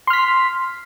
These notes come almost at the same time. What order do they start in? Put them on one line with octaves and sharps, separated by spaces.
C6 F6 B6